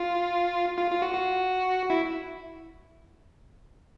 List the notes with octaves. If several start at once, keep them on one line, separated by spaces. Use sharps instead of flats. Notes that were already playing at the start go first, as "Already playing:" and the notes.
Already playing: F4
F4
F4
F#4
F#4
E4